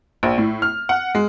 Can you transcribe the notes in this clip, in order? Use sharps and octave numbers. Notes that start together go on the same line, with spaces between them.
A#1
A2
F6
F#5
G#3